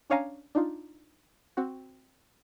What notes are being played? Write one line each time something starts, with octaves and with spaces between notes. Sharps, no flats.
C#4 D4 C#5 F5 G#5 A#5
D4 D#4 F4
C4 F#4